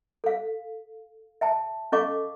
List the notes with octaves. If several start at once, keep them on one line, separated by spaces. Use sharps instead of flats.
A4 F5
E5 G5 A5
C#4 A4 D#5 F5 C#6 D6